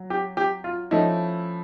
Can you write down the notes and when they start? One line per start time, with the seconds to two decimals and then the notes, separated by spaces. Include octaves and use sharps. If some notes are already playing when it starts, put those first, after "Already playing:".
Already playing: F#3
0.10 G4
0.37 G4
0.64 F4
0.91 F3 A3 C#4 D#4 E4